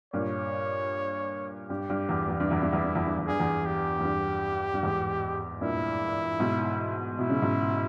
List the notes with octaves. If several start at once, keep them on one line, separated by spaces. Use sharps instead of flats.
G2 A#2 C#5
G2 G4
G2
E2
E2
G2
E2 E4
G2
E2
G2
E2
G2
E2
G2 G#4
E2
G4
E2
G2
G2
E2 G#2
G2 A#2 E4
G#2 B2
B2 E4
C#3
G#2 B2